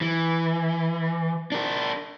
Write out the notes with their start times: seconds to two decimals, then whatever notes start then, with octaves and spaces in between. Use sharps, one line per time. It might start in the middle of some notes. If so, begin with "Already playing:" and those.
0.01 E3
1.52 D4 A#4